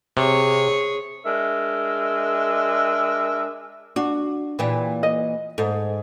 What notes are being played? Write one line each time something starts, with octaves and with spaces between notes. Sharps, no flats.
C3 G#4 C#5
G#3 D4 A#4 E5
D4 F#4
A#2 E3 G4 B4
D#5
G#2 A4